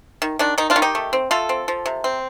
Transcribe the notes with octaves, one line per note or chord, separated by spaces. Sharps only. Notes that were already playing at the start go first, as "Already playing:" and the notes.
D#3
D#3 D4
D#3 D#4
D4 F4
D#3
D#4 G4
A3
C4
A3 F4 A4
C4
F3
C3
C4